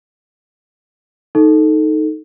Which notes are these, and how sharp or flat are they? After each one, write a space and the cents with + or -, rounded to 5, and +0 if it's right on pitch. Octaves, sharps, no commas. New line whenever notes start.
D#4 +0 A4 +0